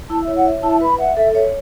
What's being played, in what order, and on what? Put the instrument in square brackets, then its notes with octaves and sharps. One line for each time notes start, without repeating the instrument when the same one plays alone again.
[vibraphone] E4 [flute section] A5
[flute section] E5
[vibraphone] C#5
[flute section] F#5
[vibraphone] E5
[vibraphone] E4 [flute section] A5
[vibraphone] B4 [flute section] B5
[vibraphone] E5 [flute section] F#5
[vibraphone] A4 [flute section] E5
[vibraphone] C#5 [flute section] E5